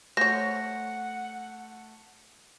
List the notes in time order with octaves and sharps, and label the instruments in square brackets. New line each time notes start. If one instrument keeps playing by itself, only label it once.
[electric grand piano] A3 [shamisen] C5 C#5 [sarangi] F#5 [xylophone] A#6